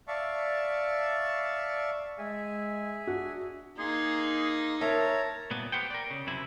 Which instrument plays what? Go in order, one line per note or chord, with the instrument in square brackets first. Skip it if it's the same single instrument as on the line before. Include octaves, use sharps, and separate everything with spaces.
[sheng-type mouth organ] D5 E5 F5 A5 C#6
[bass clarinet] G#3 [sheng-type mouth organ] G#4 E5 G#5
[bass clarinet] D4 [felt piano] F#4
[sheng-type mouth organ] A#3 C6 [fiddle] D#4 [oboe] G#4
[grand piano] A#4 E5 [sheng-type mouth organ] C#5 A#5 [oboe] A5
[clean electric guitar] A#2 G3 B3
G4 B4 C5 F#5 G5
A#4 D5
C#3
F#2 C3 E4